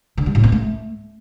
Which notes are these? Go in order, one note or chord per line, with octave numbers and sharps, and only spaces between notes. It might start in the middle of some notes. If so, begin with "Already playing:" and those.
D3
G3
A2
B3
A3